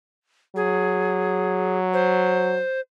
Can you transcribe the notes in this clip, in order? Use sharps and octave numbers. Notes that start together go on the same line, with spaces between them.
F#3 G#4
C5